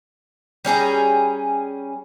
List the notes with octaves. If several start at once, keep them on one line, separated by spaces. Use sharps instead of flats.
G3 C#4 G#4 A#5